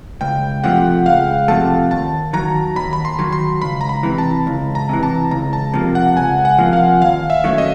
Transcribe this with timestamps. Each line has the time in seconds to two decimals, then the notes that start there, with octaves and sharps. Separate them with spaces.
0.21 C#2 G5
0.64 C3 F3 A3 F#5
1.06 C#2 F5
1.48 C3 F3 A3 A5
1.91 D#2 A5
2.33 D#3 F#3 A#5
2.76 D#2 B5
2.93 B5
3.05 C6
3.19 D#3 F#3
3.32 C6
3.62 C#2 B5
3.81 A#5
3.89 B5
4.03 C3 E3
4.18 A5
4.47 C#2
4.75 A#5
4.89 C3 E3
5.03 A5
5.31 C#2 A#5
5.53 A5
5.74 C3 F3 A#3
5.95 F#5
6.16 C#2 G#5
6.45 F#5
6.59 C3 F3 A#3
6.73 F5
7.01 D#2 F5
7.30 E5
7.44 D#3 F#3 A3 C#4
7.58 D#5